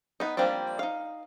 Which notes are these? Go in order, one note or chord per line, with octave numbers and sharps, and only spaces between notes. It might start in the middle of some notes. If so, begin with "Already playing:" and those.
B3 D#4
F3 G3 A#3 C4 D4
D#4 F5